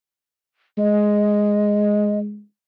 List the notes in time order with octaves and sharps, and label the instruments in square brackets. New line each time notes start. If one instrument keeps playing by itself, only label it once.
[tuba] G#3 [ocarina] D#5